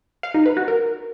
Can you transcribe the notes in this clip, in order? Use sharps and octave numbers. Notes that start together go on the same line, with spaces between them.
F5
D#4
B4
F#4
A#4